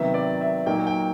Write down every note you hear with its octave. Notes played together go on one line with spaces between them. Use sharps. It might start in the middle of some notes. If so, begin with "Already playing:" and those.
Already playing: C3 D#3 F#3 B3 E5
D5
E5
A#2 F#3 A#3 D#4 G5
G5